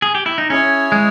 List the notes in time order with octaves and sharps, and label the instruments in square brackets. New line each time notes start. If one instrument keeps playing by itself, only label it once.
[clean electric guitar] G#4
G4
E4
D#4
[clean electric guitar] C#4 [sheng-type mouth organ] E4 G#4 C#5 G#5
[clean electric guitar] G#3